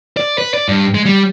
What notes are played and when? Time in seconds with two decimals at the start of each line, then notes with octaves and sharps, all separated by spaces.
0.17 D5
0.38 B4
0.54 D5
0.69 G2
0.95 G#3
1.06 G3